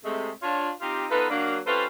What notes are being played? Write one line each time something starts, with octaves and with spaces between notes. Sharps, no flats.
C3 G#3 A3
D4 F4 C#5
C4 D#4 F4 G4
B3 D#4 F4 A4 B4
F#3 A#3 D4
G3 C#4 F4 A4 B4 C5